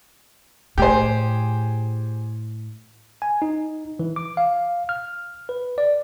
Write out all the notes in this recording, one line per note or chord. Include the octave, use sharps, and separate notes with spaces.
A2 G4 G#4 C5
G#5
D#4
E3
D6
F5
F6
B4
D5